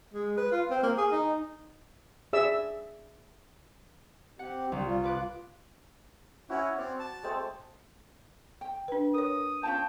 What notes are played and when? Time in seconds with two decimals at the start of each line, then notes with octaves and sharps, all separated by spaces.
0.14 G#3
0.37 B4
0.52 F4
0.71 C4
0.83 A#3
0.98 G#4
1.12 D#4
2.33 G#4 D5 E5 E6
4.39 C4 G4 F#5
4.72 C2 G3
4.86 F4
5.04 B4 D6 F#6
6.50 C#4 E4 F#4 C#5 F#5
6.78 C4 D5
6.99 A5
7.23 G#3 A3 C4
8.61 G5
8.88 D4 B4
9.14 A#4 C#5 D#6
9.63 C#4 F4 G5 A5